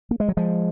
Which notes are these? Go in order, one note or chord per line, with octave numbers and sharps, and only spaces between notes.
A#3
G#3
F#3
F3 G#3